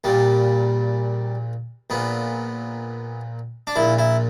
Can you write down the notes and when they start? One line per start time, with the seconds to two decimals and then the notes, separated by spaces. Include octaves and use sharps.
0.04 A#1 A#2 G3
1.90 A#1 A#2 B3
3.67 D4
3.76 A#1 A#2 E4
3.99 E4